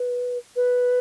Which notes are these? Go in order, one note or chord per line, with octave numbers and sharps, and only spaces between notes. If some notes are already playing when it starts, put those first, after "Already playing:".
Already playing: B4
B4